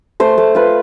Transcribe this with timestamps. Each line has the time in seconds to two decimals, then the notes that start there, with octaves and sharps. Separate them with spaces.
0.20 A3 C5
0.38 A3
0.55 F4 B4